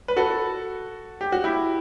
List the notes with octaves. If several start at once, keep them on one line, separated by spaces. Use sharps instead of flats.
B4
F#4 A4
G4
F#4
E4 G4